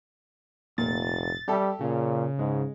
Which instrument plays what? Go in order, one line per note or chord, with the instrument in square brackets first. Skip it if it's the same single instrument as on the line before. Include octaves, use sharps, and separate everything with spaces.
[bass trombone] F1 [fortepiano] A#2 [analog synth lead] A6
[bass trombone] G3 [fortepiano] G4 A4 E5
[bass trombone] A#2 [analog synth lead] C#3
[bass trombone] G#2 [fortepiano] G#3